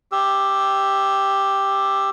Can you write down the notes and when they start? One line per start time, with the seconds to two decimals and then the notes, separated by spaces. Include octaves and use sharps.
0.12 G4 E6